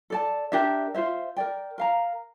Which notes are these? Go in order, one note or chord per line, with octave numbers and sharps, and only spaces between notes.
A4 D5 A5
D4 G4 A#4 E5
F4 C5 E5
A#4 D5 G5
A#4 F5 A#5